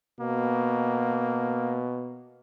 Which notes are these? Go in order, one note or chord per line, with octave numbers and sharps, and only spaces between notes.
B2 A#3